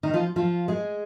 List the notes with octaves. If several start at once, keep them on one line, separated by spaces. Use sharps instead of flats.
D#3 D#4
F3 F4
F3 F4
G#3 G#4